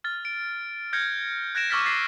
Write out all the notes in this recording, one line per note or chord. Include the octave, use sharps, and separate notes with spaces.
F6 A6
D7
F6 G6 G#6 A#6 C#7
F#6 G#6 A#6 D7 E7
C#6 D6 E6 F6 A6 B6
D6 A6 B6 C7 E7